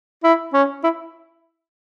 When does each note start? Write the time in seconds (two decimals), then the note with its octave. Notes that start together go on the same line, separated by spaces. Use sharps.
0.24 E4
0.53 C#4
0.83 E4